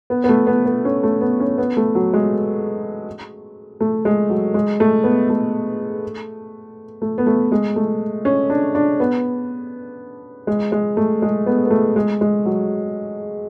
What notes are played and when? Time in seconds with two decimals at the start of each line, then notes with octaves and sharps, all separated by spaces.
0.10 B3
0.24 B3
0.29 A3
0.47 B3
0.66 B3
0.85 C#4
1.03 A3
1.21 B3
1.40 C#4
1.58 B3
1.77 A3
1.95 F#3
2.13 G#3
3.81 A3
4.05 G#3
4.30 F#3
4.54 G#3
4.80 A3
5.04 B3
5.30 A3
7.02 A3
7.18 B3
7.26 A3
7.52 G#3
7.76 A3
8.25 C#4
8.50 D4
8.75 D4
9.00 B3
10.47 G#3
10.72 G#3
10.97 A3
11.22 G#3
11.46 B3
11.65 B3
11.71 A3
11.96 G#3
12.21 G#3
12.46 F#3